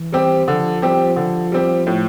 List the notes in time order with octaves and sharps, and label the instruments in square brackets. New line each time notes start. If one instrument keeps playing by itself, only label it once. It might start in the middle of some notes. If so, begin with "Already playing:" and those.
Already playing: [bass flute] E3
[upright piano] G3 C4 G4
[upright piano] D3 [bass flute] F3
[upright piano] G3 C4 G4
D3
G3 C4 G4
A2